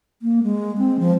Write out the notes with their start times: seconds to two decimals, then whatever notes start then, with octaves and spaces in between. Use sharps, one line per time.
0.22 A#3
0.43 G#3
0.78 C4
0.99 F3